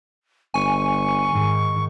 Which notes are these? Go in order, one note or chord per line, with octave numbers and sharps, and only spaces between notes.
G1 G#5 C#6
G#2 D#3